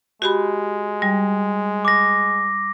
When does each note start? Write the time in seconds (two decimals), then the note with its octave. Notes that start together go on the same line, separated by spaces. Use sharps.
0.22 G#3 F#4 G4 B5
1.02 G3
1.85 D6 A#6